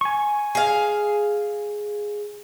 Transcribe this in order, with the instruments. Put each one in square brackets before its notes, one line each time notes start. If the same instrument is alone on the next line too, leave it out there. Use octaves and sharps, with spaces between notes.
[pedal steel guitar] G#5 C#6
[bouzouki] G#4 F5